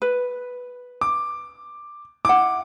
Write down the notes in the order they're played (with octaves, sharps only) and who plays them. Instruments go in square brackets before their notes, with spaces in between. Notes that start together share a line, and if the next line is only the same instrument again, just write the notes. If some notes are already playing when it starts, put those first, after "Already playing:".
[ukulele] B4
[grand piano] D6
[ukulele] E4 F#5 [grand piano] D6